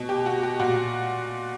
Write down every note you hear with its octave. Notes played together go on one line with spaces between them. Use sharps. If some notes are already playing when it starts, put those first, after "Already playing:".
Already playing: B2
G4
F#4
G4
A#2 F#4